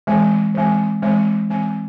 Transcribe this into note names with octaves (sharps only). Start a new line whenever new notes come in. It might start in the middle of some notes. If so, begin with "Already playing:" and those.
E3 G#3 C4
E3 G#3 C4
E3 G#3 C4
E3 G#3 C4